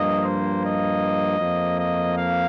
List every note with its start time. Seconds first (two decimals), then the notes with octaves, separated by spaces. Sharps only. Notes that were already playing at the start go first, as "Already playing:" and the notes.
Already playing: G2 F3 A#3 D#5
0.24 C5
0.63 D#5
1.39 F2 F3 A#3
1.79 D#5
2.17 F5